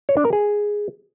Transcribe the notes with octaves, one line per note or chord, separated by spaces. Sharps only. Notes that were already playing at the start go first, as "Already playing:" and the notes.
C#5
D4
A#4
G#4